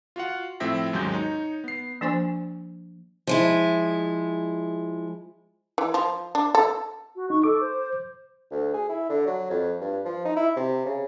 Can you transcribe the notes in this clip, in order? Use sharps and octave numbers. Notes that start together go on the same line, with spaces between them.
F4 F#4 F5 F#5
A2 F3 C4 E5 G5 A#6
D#2 G#2 F#3 G#3 C#4 G6
D#4 C#5
B3 C7
F3 A#3 D4 C5 G#5 C#6
F3 G#3 E4
E3
F3
D4
A4
F#4
D#4 C#6
A4 D6
C5
D2
G#4
E4
D3
F#3
F2
G2
F3
D#4
E4
C3
C#3